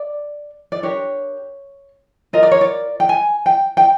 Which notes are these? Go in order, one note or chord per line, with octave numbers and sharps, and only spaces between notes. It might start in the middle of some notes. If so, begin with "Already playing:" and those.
Already playing: D5
D5
D4 G4 A#4 C#5
F4 A#4 D#5
D5
C#5
D5
G5
G#5
G5
G5